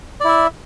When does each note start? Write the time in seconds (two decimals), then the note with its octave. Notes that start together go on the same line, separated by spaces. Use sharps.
0.20 D5
0.24 E4
0.28 E5